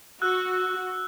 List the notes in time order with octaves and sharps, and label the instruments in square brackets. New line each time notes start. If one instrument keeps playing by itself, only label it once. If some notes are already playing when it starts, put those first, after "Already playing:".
[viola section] F#4 [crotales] E6 F#6